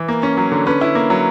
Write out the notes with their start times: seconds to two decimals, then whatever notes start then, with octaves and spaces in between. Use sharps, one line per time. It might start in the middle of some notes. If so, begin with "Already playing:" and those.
Already playing: E3
0.08 A#3
0.23 C#4
0.37 F#3
0.52 D3
0.67 C#4 B4
0.81 E4
0.95 A#3
1.10 F#3